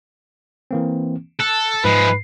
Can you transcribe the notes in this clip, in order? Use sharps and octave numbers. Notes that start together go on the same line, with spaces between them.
E3 A#3 C4
A4 A5 F#6
G#2 F3 G#3 B4